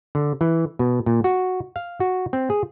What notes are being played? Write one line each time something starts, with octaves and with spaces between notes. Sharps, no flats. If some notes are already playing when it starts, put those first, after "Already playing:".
D3
E3
B2
A#2
F#4
F5
F#4
C4
G#4